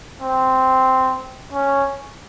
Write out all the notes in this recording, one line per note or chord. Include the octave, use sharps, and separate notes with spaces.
C4
C#4